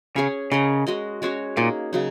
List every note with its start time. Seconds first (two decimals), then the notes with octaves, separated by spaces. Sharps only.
0.16 C#3 C#4 G#4 C#5
0.51 C#3 C#4 A#4 D#5
0.87 G#3 F#4 D#5
1.22 G#3 C#4 F#4 C#5
1.57 A#2 A#3 D#4 G#4
1.93 C#3 F#3 D#4